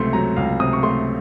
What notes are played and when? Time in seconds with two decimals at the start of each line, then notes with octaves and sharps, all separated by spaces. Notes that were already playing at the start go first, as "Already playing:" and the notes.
Already playing: C#2 C3 F#3 A3 C6
0.13 F#3 A#5
0.37 C#2 F5
0.60 C3 D#6
0.73 C#6
0.83 A3 C6